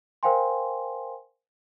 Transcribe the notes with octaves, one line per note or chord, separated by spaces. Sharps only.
A#4 C5 F5 G5 G#5 C6